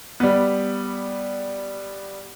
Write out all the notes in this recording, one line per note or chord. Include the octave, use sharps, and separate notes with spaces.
G3 B3